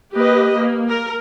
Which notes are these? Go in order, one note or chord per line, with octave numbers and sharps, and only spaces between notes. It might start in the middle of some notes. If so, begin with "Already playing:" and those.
A#3 G4 B4 D#5
A#3
A#4